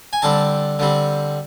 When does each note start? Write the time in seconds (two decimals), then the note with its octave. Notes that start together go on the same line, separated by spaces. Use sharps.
0.13 G#5
0.22 D3 G3 C4 A5
0.79 D3 G3 C4